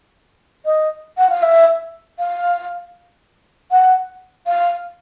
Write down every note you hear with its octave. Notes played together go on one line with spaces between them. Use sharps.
D#5
F#5
F5
E5
F5
F#5
F5